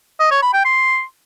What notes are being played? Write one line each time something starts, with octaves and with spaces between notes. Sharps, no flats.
D#5
C#5
B5
G5
C6